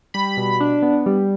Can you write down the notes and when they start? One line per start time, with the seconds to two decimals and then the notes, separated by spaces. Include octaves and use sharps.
0.14 G3 B5
0.37 B2
0.60 D4
0.82 B3
1.06 G3